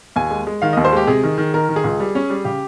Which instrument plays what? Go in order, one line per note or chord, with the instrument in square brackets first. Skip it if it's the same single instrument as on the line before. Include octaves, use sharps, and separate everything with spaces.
[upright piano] D#2 G#5
G#3
G#3
D#3 F5
D#2 D#5
C5
G#3 G4
C3 G#4
D#3
D#3
D#3 A#4
D#3
G#4
C#2
G3
C#4
G3
C#3 G4